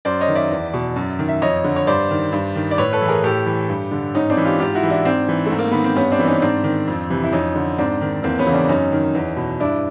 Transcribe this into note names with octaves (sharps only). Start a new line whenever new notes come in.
F#2 C5 D5
C#5 D#5
D#3
D5 E5
E2
B2
F#2
D#3
E5
F2 C#5 D#5
D3
C#5
G2 C5 D5
D#3
G2
D#3
D5
A2 B4 C#5
A4 B4
E3
G#4 A#4
A2 G4 A4
E3
G2
D3
G#2 C#4 D#4
C4 D4
E3
F4 G4
G#2 F4 G4
E4 F#4
E3
D4 E4
G#2 C4 D4
E3
G#2 A3
A#3
D#3 B3
C4
G2 B3 C#4
C4 D4
E3
C#4 D#4
G#2 C4 D4
D#3
F2
C3 E3
E4
F2 C#4 D#4
D3
G#2 C4 D4
D#3
E2 A#3 C4
B3 C#4
C#3 E3
C4 D4
F#2 C#4 D#4
D#3
E2
B2
G2 D4 E4